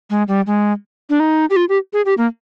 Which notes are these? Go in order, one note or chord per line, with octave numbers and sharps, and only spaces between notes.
G#3
G3
G#3
D4
D#4
G4
F4
G4
G#4
G4
A#3